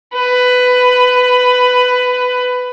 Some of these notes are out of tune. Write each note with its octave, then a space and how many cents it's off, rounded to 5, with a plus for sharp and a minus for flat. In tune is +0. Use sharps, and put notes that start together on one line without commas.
B4 +15